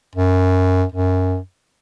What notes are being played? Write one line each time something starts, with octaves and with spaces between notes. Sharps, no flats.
F#2
F#2